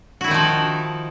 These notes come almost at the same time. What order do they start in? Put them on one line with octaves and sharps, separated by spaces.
F#4 E4 D#3 D#4 F3